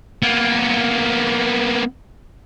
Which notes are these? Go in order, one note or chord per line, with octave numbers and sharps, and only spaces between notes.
A#3 B3